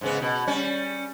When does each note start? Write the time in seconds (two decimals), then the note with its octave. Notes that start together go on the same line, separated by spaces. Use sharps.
0.01 G#2 C#3 B3
0.21 B2
0.47 G3 C#4